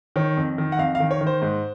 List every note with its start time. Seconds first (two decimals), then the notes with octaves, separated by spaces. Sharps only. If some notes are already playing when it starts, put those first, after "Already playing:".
0.16 D#3 C#5
0.37 F2
0.58 D#3
0.72 F#5
0.79 F2 F5
0.95 F5
1.00 D#3
1.11 C#5
1.21 D#3
1.27 C5
1.42 G#2